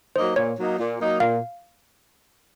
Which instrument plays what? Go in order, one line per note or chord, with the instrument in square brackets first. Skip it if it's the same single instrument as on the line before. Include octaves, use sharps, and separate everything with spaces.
[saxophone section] F#3 A#3 D#4 [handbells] C5
[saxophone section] A#2 [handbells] C#5
[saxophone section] F#3 A#3 D#4
A#2
F#3 A#3 D#4
[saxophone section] A#2 [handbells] F5